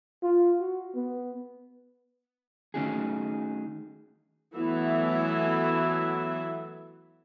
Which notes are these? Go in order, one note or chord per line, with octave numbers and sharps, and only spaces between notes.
F4
F#4
B3
D#3 A3 C#4 D#4 F#4 G#4
E3 F#3 A3 B3 E4 E5